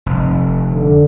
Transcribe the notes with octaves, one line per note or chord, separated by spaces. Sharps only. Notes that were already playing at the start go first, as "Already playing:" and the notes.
F1
D3